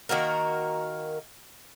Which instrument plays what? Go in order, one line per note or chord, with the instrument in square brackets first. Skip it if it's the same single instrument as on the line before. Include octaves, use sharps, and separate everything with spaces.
[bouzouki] D#3 A#3 F#4 A#4